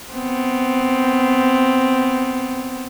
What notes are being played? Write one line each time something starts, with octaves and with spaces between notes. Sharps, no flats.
B3 C4